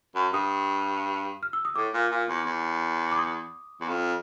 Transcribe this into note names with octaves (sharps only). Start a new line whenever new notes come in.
F#2
G2 D#6
F6
E6
D#6
A2 D6
A#2
A#2
E2
E2
D6
D#6
E2
F2